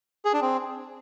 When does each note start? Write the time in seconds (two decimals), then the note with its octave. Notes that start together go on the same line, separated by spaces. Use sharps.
0.25 G#4
0.33 D4
0.42 C4